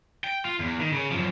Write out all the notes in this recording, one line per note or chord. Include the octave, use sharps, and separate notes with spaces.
G5
F4
E2
D#3
C#3
F#2 F3